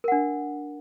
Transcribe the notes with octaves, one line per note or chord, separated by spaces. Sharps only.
D4 A#4 F#5